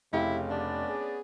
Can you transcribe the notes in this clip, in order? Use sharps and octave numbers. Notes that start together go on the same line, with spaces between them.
F1 C#3 E4 G4 F5
B3 C#4 D4 D5
G#4